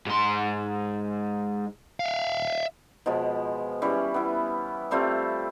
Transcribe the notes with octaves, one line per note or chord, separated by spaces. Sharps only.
G#2 C6
E5 F5
B2 F3 G#3
E3 G3 C#4
B3 E4
G3 A3 C4 F4